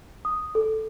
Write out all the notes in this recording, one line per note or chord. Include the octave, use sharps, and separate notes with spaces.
D#6
A4